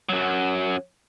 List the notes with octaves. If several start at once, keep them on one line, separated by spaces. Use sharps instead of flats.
F#2 F#3